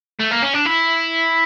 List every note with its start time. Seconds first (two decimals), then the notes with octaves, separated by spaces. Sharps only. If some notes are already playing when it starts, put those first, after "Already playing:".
0.20 A3
0.32 A#3
0.43 C#4
0.54 D4
0.66 E4